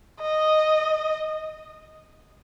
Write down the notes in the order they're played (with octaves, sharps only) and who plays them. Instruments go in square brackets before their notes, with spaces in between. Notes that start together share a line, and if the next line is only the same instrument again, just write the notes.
[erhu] D#5